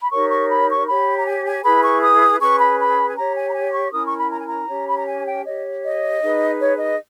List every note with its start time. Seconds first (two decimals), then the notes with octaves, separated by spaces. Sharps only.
0.01 B5
0.11 D#4 G4 A#4 C#5 C#6
0.31 C#6
0.49 B5
0.69 C#6
0.87 G4 C#5 B5
1.17 A#5
1.26 G#5
1.44 G#5
1.63 E4 G#4 B4 B5
1.83 C#6
2.02 D#6
2.40 C#4 G#4 B4 C#6
2.59 B5
2.78 B5
3.08 G#5
3.16 G4 C#5 A#5
3.35 G#5
3.47 A#5
3.54 G#5
3.73 C#6
3.92 C#4 E4 A#4 D#6
4.04 C#6
4.17 B5
4.30 A#5
4.38 G#5
4.46 A#5
4.68 C#4 G4 C#5
4.88 B5
4.97 A#5
5.06 G#5
5.25 G5
5.44 G4 C#5 D#5
5.82 D#5
6.20 D#4 G#4 B4
6.58 C#5
6.77 D#5